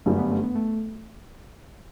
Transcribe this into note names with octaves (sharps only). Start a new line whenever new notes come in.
G1 F#2 D3 G3 A3
B3
A3
B3
A3